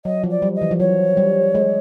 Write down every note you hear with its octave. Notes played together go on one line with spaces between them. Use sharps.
F#3 D#5
F3
D5
G3
D#5
E3
F3
F#3 C#5
G3
G#3